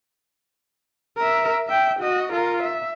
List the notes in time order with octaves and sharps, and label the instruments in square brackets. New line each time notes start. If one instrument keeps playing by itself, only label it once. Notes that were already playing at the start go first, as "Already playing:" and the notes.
[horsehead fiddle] A#4 E5
E5 G5
F#4 D#5
F4 A#4
E5